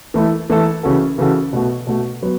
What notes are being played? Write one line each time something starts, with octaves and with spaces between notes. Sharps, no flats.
E3 A3 E4 A4
E3 A3 E4 A4
C#3 E3 C#4 F#4 A4
C#3 E3 C#4 F#4 A4
B2 A3 F#4
B2 A3 F#4
F#3 B3